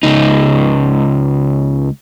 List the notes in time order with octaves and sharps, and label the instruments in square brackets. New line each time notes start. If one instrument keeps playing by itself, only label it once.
[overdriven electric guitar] C#2 D#4